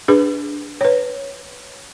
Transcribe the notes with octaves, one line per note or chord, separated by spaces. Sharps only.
D4 G#4 B4
B4 C#5